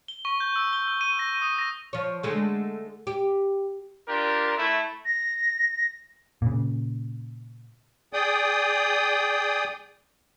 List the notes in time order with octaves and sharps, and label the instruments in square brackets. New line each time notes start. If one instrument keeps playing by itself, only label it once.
[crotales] G7
C#6
G6
E6
G7
E6
D#7
A#6
D#6
A#6
[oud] F3 C#5
D3 G#3 A3
G4
[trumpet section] D4 F4 G4 A#4
A3 E4
[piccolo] A#6
[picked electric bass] A#2 C#3
[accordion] G#4 D5 G5 D#6